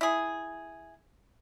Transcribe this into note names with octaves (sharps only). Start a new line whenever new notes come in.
E4 G#4